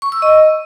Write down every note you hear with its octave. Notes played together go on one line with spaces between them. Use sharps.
C#6
E6
D#5